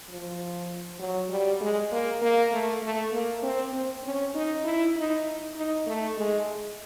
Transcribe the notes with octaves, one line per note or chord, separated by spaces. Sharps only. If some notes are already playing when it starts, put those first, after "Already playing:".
F3
F#3
G3
G#3
A#3
A#3
A3
A3
A#3
C4
C4
C#4
D#4
E4
D#4
D#4
A3
G#3